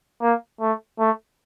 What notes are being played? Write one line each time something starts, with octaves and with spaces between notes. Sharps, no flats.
A#3
A3
A3